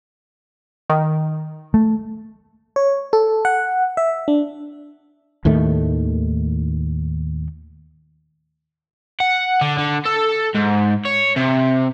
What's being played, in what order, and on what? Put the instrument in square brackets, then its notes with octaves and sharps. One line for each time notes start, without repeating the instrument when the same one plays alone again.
[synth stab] D#3
[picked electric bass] A3
[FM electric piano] C#5
A4
F#5
E5
D4
[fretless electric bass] D#2 A2 D#3 A3
[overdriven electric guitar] F#5
D3
D3
A4
G#2
C#5
C3